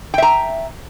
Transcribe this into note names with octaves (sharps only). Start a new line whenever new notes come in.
E5 G5 A#5